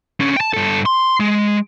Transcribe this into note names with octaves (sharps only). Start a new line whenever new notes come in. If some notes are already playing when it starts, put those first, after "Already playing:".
D3 C#4
G5 A5
G2 A4
C6
G#3